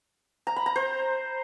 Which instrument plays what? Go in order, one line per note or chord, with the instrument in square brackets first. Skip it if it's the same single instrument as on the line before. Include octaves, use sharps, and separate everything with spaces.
[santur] A#5
B5
A#5
C5